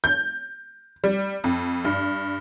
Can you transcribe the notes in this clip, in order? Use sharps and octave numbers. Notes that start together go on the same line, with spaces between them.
G6
G3
F2
G2